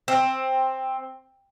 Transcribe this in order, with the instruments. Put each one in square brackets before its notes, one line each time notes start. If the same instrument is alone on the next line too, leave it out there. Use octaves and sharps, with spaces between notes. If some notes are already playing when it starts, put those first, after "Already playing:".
[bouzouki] C4